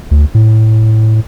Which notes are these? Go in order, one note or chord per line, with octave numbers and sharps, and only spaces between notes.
D2
A2